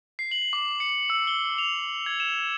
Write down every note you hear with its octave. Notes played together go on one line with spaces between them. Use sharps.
C7
F#7
D6
C#7
E6
G7
F7
G#6
E7